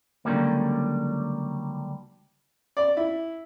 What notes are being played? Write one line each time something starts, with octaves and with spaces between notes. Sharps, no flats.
C#2 D3 E3 F#3 G3 A#3
D5
E4